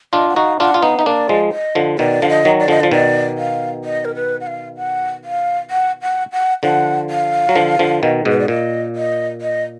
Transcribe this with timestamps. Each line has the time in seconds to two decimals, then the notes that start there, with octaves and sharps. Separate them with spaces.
0.13 D4 F4 D#5
0.29 F#5
0.36 D#4 F#4 F5
0.60 D4 F4 F#5
0.74 F4
0.82 B3 D#4 F5
0.99 D#4 D#5
1.06 A#3 D4 D5
1.29 F3 G#3
1.52 D#5
1.75 D3 F3
1.98 B2 D#3 D5
2.22 D3 F3 F5
2.29 D#5
2.45 D#3 F#3
2.60 D5
2.68 D3 F3 D#5
2.80 D5
2.83 F3
2.91 B2 D#3 D5
3.38 F5
3.84 D#5
4.05 A#4
4.15 B4
4.41 F#5
4.47 F5
4.77 F#5
5.24 F5
5.70 F#5
6.02 F#5
6.32 F#5
6.63 D3 F3 F#5
7.10 F5
7.49 F#3
7.55 D3 F3
7.79 D3 F3
8.03 B2 D#3
8.25 G#2 B2
8.31 B4
8.39 D5
8.48 A#2 D#5
8.96 D#5
9.41 D#5